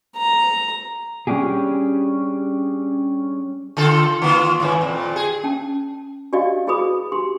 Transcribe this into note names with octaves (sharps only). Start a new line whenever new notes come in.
A#5
G3 C#4 D4 G4 G#4
D3 F4 A4
D#3 A#3 F4
G#2 E3 E4
F2 A#2
G#4
C#4 G5 A5
F#4 G4 D5 D#5 F5
E4 F#4 G#4 B4 B5 D#6
G4 C6